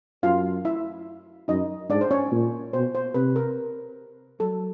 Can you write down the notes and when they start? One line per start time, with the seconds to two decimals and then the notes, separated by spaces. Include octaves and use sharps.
0.23 F#2 F4 F5
0.65 E4 E5
1.48 F#2 D#4 D#5
1.90 G#2 D4 D5
2.01 C5
2.11 C#4 C#5
2.32 A#2
2.73 B2 C5
2.95 C5
3.15 C3 B4
3.36 A#4
4.40 F#3 A4